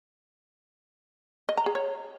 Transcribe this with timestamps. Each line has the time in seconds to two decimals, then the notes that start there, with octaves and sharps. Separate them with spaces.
1.49 D#5
1.57 A#5
1.66 G#4
1.75 C#5